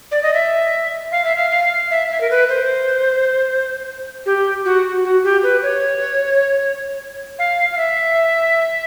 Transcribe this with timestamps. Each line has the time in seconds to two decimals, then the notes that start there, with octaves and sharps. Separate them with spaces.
0.12 D5
0.23 D#5
0.34 E5
1.12 F5
1.24 E5
1.36 F5
1.51 F5
1.91 E5
2.10 E5
2.21 A#4
2.30 B4
2.49 C5
4.26 G4
4.65 F#4
5.04 F#4
5.24 G4
5.43 B4
5.63 C#5
7.39 F5
7.71 F5
7.78 E5